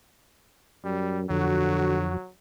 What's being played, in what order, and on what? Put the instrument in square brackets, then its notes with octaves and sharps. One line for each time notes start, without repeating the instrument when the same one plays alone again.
[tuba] F#2 [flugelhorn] G3
[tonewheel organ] F2 F3 [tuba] D3 [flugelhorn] F#3 [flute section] F#4